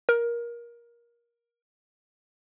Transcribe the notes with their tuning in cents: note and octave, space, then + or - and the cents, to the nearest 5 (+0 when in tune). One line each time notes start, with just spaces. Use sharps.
A#4 +20